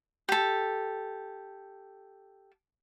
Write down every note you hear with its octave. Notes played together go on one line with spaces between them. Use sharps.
G4 A4